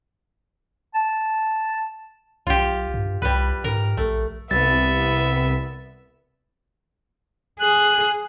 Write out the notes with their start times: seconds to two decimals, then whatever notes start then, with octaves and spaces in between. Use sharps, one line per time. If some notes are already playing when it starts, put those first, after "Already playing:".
0.95 A5
2.47 B1 F4 G4
2.94 G2
3.22 C2 G3 B4
3.64 G#2 A#4
3.97 A#1 A3
4.51 C2 B3 E5 A6
7.60 G#4 F#6